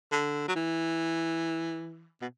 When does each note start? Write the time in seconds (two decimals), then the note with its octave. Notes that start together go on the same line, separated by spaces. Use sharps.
0.12 D3
0.48 F#3
0.56 E3
2.22 B2